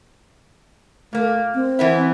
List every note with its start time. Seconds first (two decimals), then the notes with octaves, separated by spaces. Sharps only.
1.13 A#2 A3 A#3
1.55 C4
1.79 E3 B3 E4